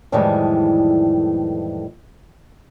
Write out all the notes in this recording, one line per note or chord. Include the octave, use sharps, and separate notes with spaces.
F2 A2 D#3 E3 G3 G#3